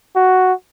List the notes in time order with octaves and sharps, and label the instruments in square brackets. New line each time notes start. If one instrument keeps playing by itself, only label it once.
[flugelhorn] F#4